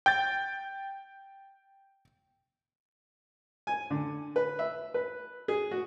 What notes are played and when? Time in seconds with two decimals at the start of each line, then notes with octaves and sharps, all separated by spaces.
0.06 G5 G6 A6
3.67 G#5
3.90 D3
4.36 B4
4.59 E5
4.94 B4
5.48 G#4
5.71 F#4